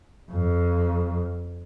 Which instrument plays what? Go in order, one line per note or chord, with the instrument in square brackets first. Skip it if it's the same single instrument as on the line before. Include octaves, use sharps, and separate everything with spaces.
[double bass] F2